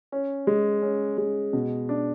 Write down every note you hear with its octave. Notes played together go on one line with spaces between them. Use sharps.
C#4
G#3
C#4
G#3
B2
D4